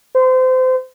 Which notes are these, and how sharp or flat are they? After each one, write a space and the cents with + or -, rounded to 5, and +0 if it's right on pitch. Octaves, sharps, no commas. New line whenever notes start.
C5 -30